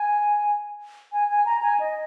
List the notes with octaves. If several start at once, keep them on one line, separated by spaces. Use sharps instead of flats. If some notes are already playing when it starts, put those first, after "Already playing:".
Already playing: G#5
G#5
G#5
A#5
G#5
D#5